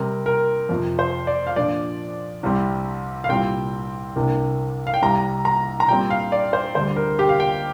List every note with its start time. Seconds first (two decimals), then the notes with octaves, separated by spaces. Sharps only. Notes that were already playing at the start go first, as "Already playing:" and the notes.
Already playing: C3 G3 C4 A#4
0.26 A#4
0.69 F2 C3 F3
0.99 C5
1.27 D5
1.47 F5
1.56 A#2 F3 D4 D5
2.43 C2 C3 G3 C4
3.24 F5
3.29 C2 A#2 G3 C4 G5
4.16 C2 C3 A#3 D4
4.87 F5
4.94 G5
5.02 C2 C3 G3 A#5
5.45 A#5
5.80 A#5
5.88 A#2 G3 C4 G5
6.10 F5
6.32 D5
6.53 C5
6.75 D2 D3 G3 D4 C5
6.96 A#4
7.19 G4
7.29 F5
7.40 G5